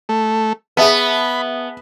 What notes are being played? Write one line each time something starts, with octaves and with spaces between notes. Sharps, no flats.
A3
B3 G#4 E5 A5 B5